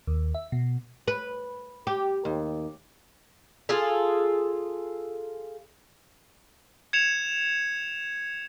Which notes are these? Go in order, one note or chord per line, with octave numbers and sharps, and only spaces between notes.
D#2
E5
B2
B4
G4
D#2
F4 G#4 A4
G#6 C#7 E7 F7